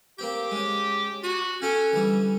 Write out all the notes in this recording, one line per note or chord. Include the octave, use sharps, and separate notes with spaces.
A#3 C4 G4 G5
G#3 C#4
F#4 G#5
C#4 F#4 A4 G5
D3 E3 G3